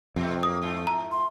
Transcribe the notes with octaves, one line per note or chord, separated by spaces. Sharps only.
F2 B2 A3 C4
F#3 A#3 D#6
G#2 A3 F4
A#5
C6